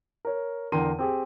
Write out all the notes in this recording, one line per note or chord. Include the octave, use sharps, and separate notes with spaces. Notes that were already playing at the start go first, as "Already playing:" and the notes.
A#4 C#5
E2 D3 A#4 G5 C6 D#7
C4 G4 G#4